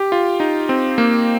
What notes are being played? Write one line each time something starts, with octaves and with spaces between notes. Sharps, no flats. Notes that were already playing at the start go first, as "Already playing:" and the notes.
Already playing: G4
F4
D#4
C4
A#3